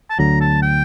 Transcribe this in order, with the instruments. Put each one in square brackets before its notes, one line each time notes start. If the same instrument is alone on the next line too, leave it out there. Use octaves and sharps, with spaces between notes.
[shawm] A5
[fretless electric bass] D2 D3 F#3 [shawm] A#5
[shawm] A5
G5